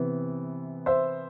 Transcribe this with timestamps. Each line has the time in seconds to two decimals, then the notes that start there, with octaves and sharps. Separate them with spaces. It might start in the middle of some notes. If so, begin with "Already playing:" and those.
Already playing: C3 E3 B3
0.86 C5 E5